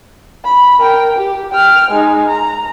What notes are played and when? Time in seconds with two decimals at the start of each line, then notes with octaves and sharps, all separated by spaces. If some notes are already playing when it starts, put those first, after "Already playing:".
0.45 B5
0.79 A#4 G5
1.16 G4
1.52 G5 F6
1.91 G#3 D#4
2.28 A#5